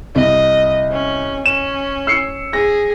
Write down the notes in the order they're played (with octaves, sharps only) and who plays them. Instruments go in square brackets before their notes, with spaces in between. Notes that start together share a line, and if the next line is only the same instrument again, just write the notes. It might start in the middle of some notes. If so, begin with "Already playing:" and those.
[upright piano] C2 [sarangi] D#5
[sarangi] C#4
[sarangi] C#4 [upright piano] E7
[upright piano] E6 C7 C#7
[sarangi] G#4 [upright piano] A#6